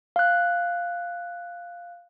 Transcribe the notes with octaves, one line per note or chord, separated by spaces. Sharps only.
F5 F#6